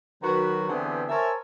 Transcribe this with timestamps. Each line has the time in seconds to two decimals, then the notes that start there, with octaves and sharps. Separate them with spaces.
0.23 D#3 F#3 F#4 B4
0.68 D3 E3 B3 C4 G4 G#4
1.09 A#4 C5 C#5 E5 G#5 A5